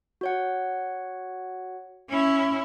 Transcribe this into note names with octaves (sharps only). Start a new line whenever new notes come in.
F#4 C#5 F#5
C#4 E4